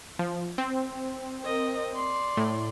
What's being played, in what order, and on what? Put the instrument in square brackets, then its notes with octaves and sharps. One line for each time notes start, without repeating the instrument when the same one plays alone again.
[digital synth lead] F3
C4
[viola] A#4 D#5
D5 C6
[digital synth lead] A2